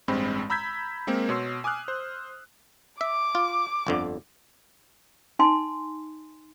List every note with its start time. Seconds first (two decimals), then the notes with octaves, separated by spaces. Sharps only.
0.08 A1 G2 G#3 C4 B5
0.50 A#5 B5 E6 G6 G#6 B6
1.07 G#3 A#3 C4 A#4
1.29 B2 C#5 C6 E6 C7
1.64 G#5 D6 D#6 F6 F#6
1.88 C5
3.01 E5 D6
3.35 F4
3.87 G1 F2 D3
5.39 D#4 G#5 C6